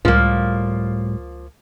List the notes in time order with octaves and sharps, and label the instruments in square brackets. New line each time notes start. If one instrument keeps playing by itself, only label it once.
[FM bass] C#2 [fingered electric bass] A2 G3 [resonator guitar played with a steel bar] F3 A#3